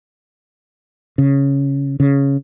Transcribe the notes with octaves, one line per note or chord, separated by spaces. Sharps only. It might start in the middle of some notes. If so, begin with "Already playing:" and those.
C#3
C#3